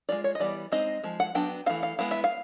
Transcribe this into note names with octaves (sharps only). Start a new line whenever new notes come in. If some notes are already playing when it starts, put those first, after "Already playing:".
G#3 C4 F4 D5
C#5
D#5
E3 G3 B3 D5
G#3 C4 D#4 D#5
F3 G#3
F#5
F#3 B3 D4 G5
E3 A3 C4 F5
F5
G#3 B3 E4 F5
E5
F5